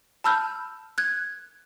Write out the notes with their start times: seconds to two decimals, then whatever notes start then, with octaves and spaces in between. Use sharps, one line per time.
0.24 A5 B5 E6 F6 G6
0.98 F#6 G#6